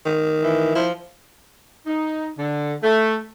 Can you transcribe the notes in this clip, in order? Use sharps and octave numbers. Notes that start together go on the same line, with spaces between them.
D#3
E3
F3 E4
D#4
D3
A3